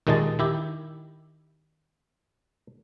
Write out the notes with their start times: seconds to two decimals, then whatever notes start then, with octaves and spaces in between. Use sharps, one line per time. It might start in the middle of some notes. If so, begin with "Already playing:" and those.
0.07 D#2 A#2 D#3 G#3 D#5 A5
0.39 D#3 E4 G4